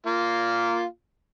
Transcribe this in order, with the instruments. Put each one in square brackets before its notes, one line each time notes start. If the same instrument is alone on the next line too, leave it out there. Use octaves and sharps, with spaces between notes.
[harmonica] A#3 F4